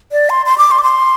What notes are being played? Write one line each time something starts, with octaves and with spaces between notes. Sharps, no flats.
D5
C6
C6
D6
C6
D6
C6